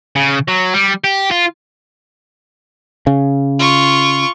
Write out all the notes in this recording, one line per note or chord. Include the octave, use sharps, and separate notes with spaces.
C#3
F#3
G3
G4
F4
C#3
F4 C#6